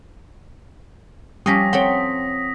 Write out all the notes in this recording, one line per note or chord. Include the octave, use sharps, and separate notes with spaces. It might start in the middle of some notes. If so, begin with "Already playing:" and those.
F3 G3 C#4 G4 D#6 A#6 B6
C4 A4 C#5 F#5 G5